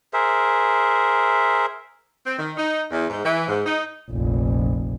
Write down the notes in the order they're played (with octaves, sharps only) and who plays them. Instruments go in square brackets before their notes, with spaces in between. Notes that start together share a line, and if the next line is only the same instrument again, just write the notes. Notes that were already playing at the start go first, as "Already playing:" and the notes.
[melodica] G#4 A#4 C5 E5
[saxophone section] C4
D#3
D#4
E2
G#2
E3
G#2
D#4
[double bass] F1 A#1